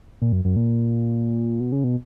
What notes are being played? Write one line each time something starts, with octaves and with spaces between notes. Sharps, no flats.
A#2
F#2
F#2
A#2
B2
C#3
B2